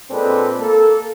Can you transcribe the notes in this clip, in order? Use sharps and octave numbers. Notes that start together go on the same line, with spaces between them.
A#2 G#3 C4 D4 A4 B4
A#3 A4